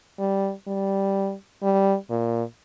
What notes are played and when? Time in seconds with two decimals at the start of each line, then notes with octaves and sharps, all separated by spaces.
0.19 G3
0.67 G3
1.63 G3
2.10 A#2